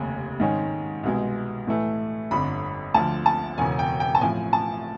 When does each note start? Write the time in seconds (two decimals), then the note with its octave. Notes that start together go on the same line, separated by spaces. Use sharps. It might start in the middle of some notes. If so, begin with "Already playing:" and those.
Already playing: F1 D#2 C#3
0.40 G#2 D#3 G#3 C#4
1.03 C2 B2 G#3
1.67 A2 E3 A3
2.31 G1 F2 D3 B5
2.94 D2 D3 F3 A5
3.26 A5
3.58 E1 E2 C#3 G#5
3.79 G5
4.00 G5
4.15 A5
4.21 A1 A2 F3 G#5
4.53 A5